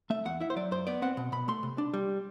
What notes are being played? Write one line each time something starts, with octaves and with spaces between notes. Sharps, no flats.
A3 E5
E2 F#5
E4 E5
C5
F#3 D5
F#2 C5
B3 D5
C4 F#5
B2
B2 B5
A3 C6
C3
D4
G3